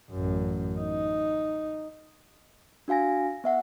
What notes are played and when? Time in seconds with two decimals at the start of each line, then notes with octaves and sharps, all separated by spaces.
0.11 A1 F#2
0.78 D#4
2.88 D4 F#4 F5 G#5 A#6
3.44 B3 E5 F#5